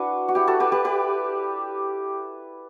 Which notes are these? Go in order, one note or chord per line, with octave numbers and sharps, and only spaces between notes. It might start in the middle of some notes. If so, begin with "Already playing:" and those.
Already playing: D4 E4 F#4 B4
F#4
E4 G4
F#4 A4
G4 B4
G4 B4
G4 B4